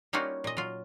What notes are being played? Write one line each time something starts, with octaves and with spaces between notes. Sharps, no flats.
G3 A#3 C#4 D#4 F4 F#4
A#2 D#5
F#3 F4